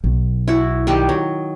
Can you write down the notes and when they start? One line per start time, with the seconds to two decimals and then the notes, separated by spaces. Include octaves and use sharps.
0.04 B1
0.48 E4 F#4
0.87 D#3 G3 G4
1.09 F#3